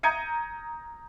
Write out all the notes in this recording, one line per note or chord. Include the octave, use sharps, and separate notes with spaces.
A#5 D#6 G6 G#6 C#7 D#7